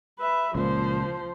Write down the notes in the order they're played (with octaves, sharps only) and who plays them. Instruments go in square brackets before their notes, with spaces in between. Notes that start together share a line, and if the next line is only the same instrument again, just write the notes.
[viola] B4 E5
[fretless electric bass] C#2 A#2 [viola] F3 C5